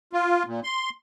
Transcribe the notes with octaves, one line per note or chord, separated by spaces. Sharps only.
F4
A#2
C6